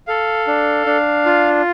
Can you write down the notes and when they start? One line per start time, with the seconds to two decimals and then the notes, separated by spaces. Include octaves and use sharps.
0.07 A4 F5
0.47 D4
0.86 D4
1.26 F4